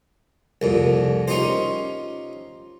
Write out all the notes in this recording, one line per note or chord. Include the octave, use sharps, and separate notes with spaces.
C2 F2 A#2
C#4 D#4 F4 G4 C5